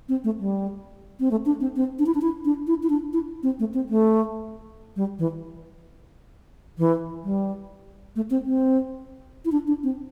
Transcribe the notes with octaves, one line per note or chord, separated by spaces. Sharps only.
C4
A3
G3
C4
A3
D4
C4
C4
D4
E4
D4
E4
D4
E4
E4
D4
E4
C4
A3
C4
A3
G3
E3
E3
G3
A3
C4
C4
E4
D4
D4
C4